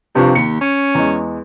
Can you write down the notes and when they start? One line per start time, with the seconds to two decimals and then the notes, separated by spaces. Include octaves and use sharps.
0.15 G2 C3 F3 C#6
0.35 D#2 C#7
0.61 C#4
0.95 E2 G#3